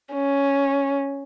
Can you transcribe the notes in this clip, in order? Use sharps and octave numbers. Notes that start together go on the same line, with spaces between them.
C#4